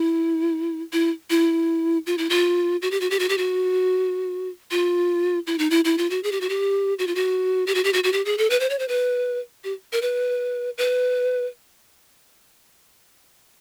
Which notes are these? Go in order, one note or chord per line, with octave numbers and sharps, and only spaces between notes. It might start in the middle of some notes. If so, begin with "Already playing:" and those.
Already playing: E4
E4
E4
F4
E4
F4
F#4
G4
F#4
G4
F#4
G4
F#4
F4
E4
D#4
E4
E4
F4
F#4
G#4
G4
F#4
G4
F#4
F4
F#4
G4
F#4
G4
F#4
F#4
G4
G#4
A4
B4
C5
C#5
C5
B4
G4
A#4
B4
B4